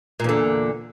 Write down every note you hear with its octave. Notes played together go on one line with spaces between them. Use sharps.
E2 A#2 D3